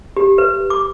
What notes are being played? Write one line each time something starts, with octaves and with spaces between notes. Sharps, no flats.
G4
B4
D6